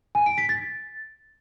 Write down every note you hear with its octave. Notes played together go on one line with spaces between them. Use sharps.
G#5
D7
B6
A6